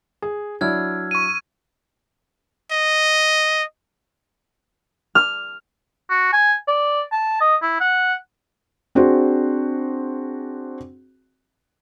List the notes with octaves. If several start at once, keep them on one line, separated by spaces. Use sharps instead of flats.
G#4
F#3 D4 E4 E6 F6 G#6
C#6 D#7
D#5
F6
F#4
G#5
D5
A5
D#5
E4
F#5
C4 D4 F#4 G#4 C5